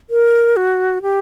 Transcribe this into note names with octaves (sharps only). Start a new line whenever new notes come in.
A#4
F#4
G4